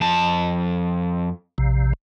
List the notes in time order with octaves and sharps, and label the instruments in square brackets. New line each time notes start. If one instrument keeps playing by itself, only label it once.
[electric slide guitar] F2 A5
[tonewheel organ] A#1 C3